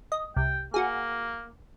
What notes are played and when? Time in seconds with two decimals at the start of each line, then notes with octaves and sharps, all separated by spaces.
0.12 D#5
0.37 C2 G5
0.74 A#3 F#4 G#4